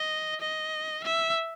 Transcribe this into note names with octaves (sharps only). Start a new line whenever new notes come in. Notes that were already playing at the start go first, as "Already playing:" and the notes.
Already playing: D#5
D#5
E5